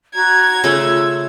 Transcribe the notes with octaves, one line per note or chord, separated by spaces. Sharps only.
F#4 A#5 G#6
C#3 A3 F4 E6